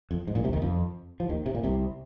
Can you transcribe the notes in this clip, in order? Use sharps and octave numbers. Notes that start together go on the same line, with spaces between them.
F2
G#2
A#1 A#2
C2 C3
D#2 D#3
F2 F3
F3
D#2 D#3
C3
A#2
C2 C3